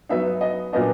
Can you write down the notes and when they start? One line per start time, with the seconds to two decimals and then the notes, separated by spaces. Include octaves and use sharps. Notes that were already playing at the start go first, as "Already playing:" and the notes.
0.09 F#3 B3 D#4 E5
0.41 D#5
0.73 A#2 F#3 B3 D4 D#5